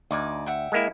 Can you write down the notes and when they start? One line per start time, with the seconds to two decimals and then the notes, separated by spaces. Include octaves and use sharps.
0.11 D2 D#4 D5 G#5
0.46 E5 F#5 G5
0.72 G#3 A#3 E4